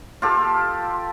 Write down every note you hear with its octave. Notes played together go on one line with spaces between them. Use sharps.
F4 G4 A4